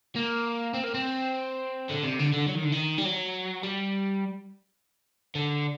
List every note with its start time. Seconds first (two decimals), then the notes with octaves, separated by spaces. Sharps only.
0.16 A#3
0.74 C4
0.84 A#3
0.94 C4
1.89 D3
2.03 C3
2.19 D3
2.33 D3
2.47 F#3
2.55 D#3
2.64 D3
2.72 D#3
2.98 G3
3.05 F#3
3.63 G3
5.35 D3